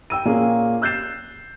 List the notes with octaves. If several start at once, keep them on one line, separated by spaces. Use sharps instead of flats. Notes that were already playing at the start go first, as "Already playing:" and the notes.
G5 E6 D#7
A#2 A#3 C#4 G#4
E6 F#6 G6 A6 C7 E7